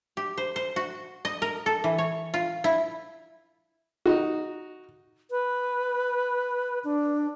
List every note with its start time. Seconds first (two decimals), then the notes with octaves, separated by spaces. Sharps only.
0.17 G4
0.38 C5
0.56 C5
0.76 F#4
1.25 D#5
1.42 A#4
1.66 A4
1.84 E3
1.98 C#5
2.34 F4
2.64 E4
4.06 D#4 F#4
5.31 B4
6.84 D4